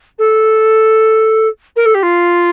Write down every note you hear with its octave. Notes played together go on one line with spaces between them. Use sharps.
A4
A#4
A4
G4
F4